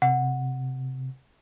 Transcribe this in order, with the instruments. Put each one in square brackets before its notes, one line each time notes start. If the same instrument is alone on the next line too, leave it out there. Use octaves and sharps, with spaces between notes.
[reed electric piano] C3 [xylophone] F#5